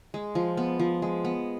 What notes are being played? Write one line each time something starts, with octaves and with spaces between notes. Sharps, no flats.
G#3
F3
B3
F3
G#3
B3